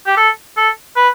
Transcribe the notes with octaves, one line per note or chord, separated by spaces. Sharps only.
G4
A4
A4
B4